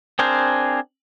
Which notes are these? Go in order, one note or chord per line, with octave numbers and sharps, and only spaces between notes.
C4 D4 G#4 A#4 C5